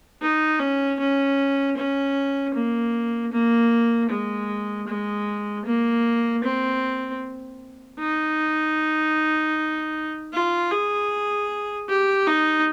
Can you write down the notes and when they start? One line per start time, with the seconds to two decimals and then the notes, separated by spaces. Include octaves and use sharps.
0.21 D#4
0.59 C#4
0.99 C#4
1.77 C#4
2.54 A#3
3.32 A#3
4.09 G#3
4.88 G#3
5.65 A#3
6.44 C4
7.99 D#4
10.33 F4
10.71 G#4
11.88 G4
12.26 D#4